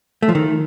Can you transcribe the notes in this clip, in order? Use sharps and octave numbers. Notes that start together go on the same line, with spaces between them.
A3
F3
D#3